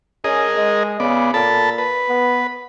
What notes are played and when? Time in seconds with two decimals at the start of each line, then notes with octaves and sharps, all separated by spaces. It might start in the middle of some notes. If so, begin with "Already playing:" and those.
0.24 C#4 G#4 A#4 D#5
0.57 G#3
1.00 C#3 B3 D5
1.34 A#2 A4 A5 B5
1.78 B4
2.09 B3